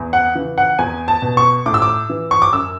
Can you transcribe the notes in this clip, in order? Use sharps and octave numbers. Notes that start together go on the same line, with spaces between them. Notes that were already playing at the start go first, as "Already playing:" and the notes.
Already playing: E2
F#5
C#3 E3
F#5
E2 G#5
A5
B2
C#6
A2 D6
E6
D6
E3
C#6
D6
F#2 E6